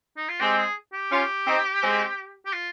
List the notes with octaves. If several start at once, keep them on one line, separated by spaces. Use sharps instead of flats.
D#4
F4
G#3 C4 G4
G#4
G4
C#4 F4
C4 D#4
G#3 C4
G4
F4